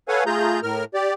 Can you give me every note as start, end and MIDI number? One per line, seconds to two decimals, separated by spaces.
0.08 0.24 69
0.08 0.24 71
0.08 0.24 73
0.08 0.24 77
0.08 0.24 78
0.08 0.24 80
0.26 0.60 57
0.26 0.60 65
0.26 0.60 68
0.26 0.60 82
0.26 0.60 91
0.63 0.84 45
0.63 0.84 70
0.63 0.84 89
0.94 1.14 67
0.94 1.14 74